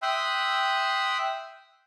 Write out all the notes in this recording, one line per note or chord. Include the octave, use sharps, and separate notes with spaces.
E5 G5 C6 D#6 E6 F#6